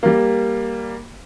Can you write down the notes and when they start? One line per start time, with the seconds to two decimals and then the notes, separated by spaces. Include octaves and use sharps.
0.03 G3 A#3